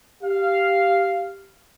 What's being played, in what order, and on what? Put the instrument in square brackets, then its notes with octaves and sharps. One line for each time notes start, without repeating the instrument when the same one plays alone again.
[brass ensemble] G4 F5